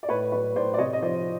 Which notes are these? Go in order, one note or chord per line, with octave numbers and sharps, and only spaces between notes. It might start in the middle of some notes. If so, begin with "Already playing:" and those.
D5
A2 B4 C#5
F#3 B4 C#5
A2 C5 D5
D5
C3 C#5 D#5
D#5
F3 C5 D5